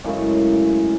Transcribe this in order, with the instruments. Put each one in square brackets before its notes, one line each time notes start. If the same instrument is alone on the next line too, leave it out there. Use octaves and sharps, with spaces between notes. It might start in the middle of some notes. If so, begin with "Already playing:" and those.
[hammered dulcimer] F#2 A2 C#3 G#3